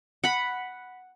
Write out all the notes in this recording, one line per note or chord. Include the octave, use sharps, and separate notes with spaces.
F#5 B5